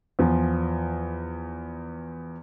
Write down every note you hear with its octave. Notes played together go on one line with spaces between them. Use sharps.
E2 F3